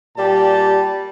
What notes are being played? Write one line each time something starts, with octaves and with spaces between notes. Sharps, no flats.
A#2 G3 G4 A5